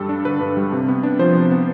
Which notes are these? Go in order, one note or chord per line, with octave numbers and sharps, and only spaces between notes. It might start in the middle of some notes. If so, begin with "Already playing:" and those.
Already playing: G2 G3 A4
D4
D3 B4
G2
G3
C3
B3
D4
F3 C5
C3
B3